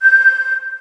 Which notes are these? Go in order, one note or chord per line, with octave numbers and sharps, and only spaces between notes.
G6